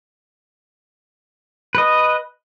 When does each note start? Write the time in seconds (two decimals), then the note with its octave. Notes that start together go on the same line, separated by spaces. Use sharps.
1.75 B4 D#5